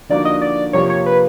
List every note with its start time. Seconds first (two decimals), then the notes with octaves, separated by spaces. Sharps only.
0.09 D3 F3 A#3 D#4 F#4 D5
0.25 D#5
0.41 D5
0.73 C3 F3 A#3 C#5
0.90 C#5
1.06 B4